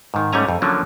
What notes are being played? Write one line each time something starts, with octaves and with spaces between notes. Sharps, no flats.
G#2 D#3
G#2 G3 A3 C#4 G#5 A#5
F2
D3 F3 F#3 A#3 C#4 D4